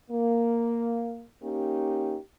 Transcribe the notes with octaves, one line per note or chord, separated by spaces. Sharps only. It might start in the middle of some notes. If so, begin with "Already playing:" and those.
A#3
A#3 C#4 D#4 G4